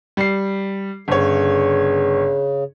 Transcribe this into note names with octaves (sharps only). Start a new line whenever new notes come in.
G3 C7
G1 C#3 C#5